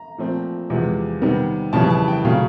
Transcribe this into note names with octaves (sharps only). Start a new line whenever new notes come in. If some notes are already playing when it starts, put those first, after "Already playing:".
Already playing: A#5
A#2 F3 A3 C4
E2 C3 F3 G#3
C3 D#3 G3 B3
F2 C#3 E3 G3 A5
A5
G5
C#3 F#3 A3 F5